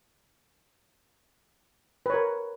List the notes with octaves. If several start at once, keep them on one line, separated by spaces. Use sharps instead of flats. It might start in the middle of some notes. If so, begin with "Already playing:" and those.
A#4 B4 C#5